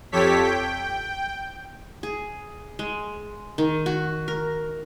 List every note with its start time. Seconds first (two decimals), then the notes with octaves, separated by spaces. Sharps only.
0.12 F2 G4 A4 C#5 B6
0.43 G5
2.03 G#4
2.79 G#3
3.58 D#3
3.86 F#4
4.28 A#4